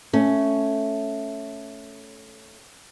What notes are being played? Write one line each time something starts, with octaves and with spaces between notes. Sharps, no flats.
A3 C#4